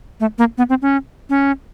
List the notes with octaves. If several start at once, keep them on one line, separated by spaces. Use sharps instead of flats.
A3
A#3
B3
C4
C#4
C#4